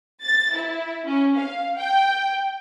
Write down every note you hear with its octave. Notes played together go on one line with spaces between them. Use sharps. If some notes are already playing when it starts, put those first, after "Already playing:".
A6
E4
C#4
F5
G5